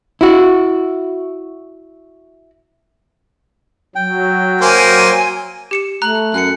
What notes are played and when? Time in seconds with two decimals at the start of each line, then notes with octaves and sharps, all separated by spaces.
0.21 E4 F#4
3.95 F#3 G5
4.61 A#3 C5 G#5
5.71 G4 C#7 E7
6.02 A3 A#5 F#6 F#7
6.34 F#2 F#6 C#7